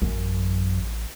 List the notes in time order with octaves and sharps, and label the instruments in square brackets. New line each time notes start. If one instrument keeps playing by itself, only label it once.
[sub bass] A1 [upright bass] F#2